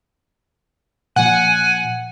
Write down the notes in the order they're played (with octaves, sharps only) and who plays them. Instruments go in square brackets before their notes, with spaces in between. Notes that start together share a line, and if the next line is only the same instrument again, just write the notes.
[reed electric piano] A#2 F3 [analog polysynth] F#5 [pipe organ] G#5